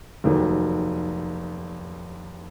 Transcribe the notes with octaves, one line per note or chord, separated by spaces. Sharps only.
F1 D#2 D#3 F#3